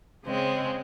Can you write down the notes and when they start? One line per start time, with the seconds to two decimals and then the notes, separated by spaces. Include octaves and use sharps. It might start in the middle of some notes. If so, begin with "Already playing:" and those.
0.24 C#3 G#3 C4